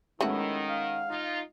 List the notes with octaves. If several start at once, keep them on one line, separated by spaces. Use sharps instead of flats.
D#3 G#3 A3 B3 C#4 E4 F#4 F#5
F5
D#4 F4